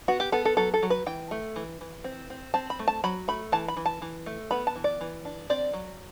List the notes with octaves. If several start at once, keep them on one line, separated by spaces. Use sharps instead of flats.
B3 F#4
G4
B3 A4
A4
F#3 A4
A4
F#3
B4
E3 G5
A3
E3
E3
C4
C4
C4 A5
B5
A3
A5
F#3 B5
A3 B5
E3 A5
B5
E3
A5
E3
A3
B3 B5
A5
E3
D5
E3
D4
C4 D5
F#3